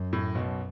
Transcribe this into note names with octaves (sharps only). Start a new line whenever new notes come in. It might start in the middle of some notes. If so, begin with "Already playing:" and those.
Already playing: F#2
A2
B1 B2